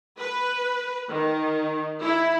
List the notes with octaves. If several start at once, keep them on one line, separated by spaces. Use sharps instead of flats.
B4
D#3
E4